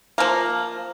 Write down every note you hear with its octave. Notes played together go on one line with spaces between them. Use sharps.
F3 A#3